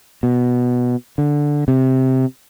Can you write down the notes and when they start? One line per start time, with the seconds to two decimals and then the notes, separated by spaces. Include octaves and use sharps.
0.23 B2
1.18 D3
1.68 C3